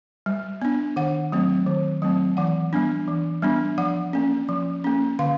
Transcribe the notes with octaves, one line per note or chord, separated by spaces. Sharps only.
G3
B3 D4
D#3 F#5
F#3 A3 C4
D#3
F#3 A3 C4
E3 F#5
G3 B3 D4
E3
G3 B3 D4
F3 F#5
A#3 C#4
F3
A#3 C#4
D3 F5